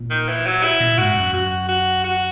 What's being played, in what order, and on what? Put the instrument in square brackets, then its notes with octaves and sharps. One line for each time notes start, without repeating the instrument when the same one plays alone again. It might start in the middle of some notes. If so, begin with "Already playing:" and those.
Already playing: [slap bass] A#2
[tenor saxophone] D#3
E3
F#3
E4
[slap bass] A#2
[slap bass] G#2 [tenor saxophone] F#4
[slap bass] F#2
[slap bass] F#2 [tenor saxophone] F#4
[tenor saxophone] F#4
F#4